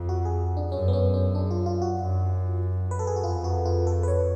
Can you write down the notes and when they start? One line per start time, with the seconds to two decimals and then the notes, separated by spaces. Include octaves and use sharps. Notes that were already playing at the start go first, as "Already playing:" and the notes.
Already playing: F2
0.09 F#4
0.25 G#4
0.57 D4
0.72 F#2 C#4
0.88 B3
0.93 C#4
1.14 C#4
1.35 D4
1.51 F4
1.66 F4
1.82 F#4
1.98 F#2
2.91 B4
2.99 A4
3.07 G#4
3.16 F#4
3.24 F2 F4
3.44 F#4
3.66 F4
3.87 A4
4.03 B4
4.08 C#5